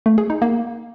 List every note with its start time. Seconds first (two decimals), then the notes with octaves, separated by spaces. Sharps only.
0.06 A3
0.18 G#4
0.30 D#4
0.42 A#3